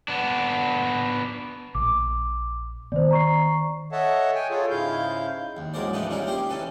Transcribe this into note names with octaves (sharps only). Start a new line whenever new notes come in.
B3 D4
A#1 D6
D#3 B3 C5 D5
A#5 C#6 C7
A4 C#5 D#5 E5 F#5 A5
G5 G#5
F4 G#4 A4 C#5
G#2 C#3 G#3 E4 F5 G6
D#2
A1 F#3 G#3 A#4 C5 D5
F3 A3 D4 D#4 B4
A#2 G3 C#4 D#4 E4 A#4
G4 C5 G5 A#5 C6
E3 C#4 A4 B4